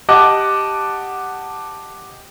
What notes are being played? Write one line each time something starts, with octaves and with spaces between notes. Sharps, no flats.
G4 D#5 F#5 A5 D6 F#6